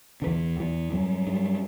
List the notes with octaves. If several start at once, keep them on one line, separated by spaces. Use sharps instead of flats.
D3
E2 E3
E2 E3
G2 F#3
G2